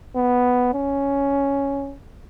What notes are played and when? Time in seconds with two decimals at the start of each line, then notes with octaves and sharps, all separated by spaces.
0.16 B3
0.74 C#4